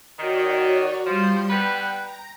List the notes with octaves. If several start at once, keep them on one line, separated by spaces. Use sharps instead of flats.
D#3 F#4 C#5 D5
F3 G3 C6 G6
G3 B3 B4 G5
A#5